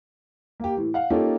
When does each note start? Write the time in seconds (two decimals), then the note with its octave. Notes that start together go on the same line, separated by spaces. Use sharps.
0.60 A#3 G4
0.77 A2 E3
0.94 F5 F#5
1.10 A#3 C#4 D#4 F4 G4 A4